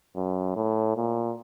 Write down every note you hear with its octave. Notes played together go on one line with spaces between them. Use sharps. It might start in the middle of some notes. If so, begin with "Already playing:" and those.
F#2
A2
A#2